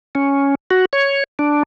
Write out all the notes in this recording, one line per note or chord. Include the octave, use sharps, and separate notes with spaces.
C#4
F#4
C#5
D4